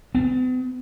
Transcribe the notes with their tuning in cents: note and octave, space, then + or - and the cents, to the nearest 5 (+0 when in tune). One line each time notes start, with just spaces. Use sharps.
B3 +45